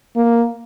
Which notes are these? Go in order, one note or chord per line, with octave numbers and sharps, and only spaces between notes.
A#3